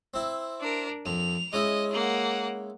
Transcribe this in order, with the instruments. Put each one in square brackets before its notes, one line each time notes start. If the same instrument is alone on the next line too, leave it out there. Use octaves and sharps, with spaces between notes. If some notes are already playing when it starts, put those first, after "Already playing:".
[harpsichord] C4 E4
[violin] D4 A#4
[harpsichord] F2 [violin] F7
[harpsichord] G#3 C#4 E4 [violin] D#5
[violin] A#3 F#5